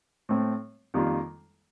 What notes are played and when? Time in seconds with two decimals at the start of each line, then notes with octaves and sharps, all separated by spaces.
0.29 A2 A3 C4
0.94 F2 D#3 G3 A#3 F4